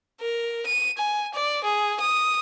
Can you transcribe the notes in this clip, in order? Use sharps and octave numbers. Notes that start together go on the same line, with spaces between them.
A#4
D#7
G#5
D5
G#4
D#6